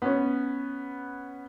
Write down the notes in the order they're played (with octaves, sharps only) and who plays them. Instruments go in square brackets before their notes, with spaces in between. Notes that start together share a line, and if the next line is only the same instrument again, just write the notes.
[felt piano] B3 C#4